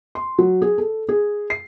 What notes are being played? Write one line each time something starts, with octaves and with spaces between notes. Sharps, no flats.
C6
F#3
G#4
A4
G#4
C7